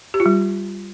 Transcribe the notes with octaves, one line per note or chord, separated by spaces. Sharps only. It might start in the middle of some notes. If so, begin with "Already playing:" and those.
G4
F4
G3